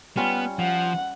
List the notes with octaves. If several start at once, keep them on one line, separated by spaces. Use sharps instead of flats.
G3 B3 C#4 F4
F3 F#5